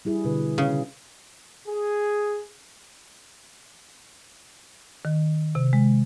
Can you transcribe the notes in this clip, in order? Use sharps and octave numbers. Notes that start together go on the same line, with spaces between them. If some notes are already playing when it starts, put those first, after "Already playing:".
G3 E4 G#4
B2 D3 B4
C#3
G#4
D#3
C3
G#3